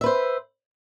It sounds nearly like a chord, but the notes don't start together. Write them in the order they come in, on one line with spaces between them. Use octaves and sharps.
E5 B4 C5